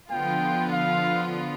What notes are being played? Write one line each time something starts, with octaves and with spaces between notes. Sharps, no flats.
D3 F3 B3 F4 G5
F5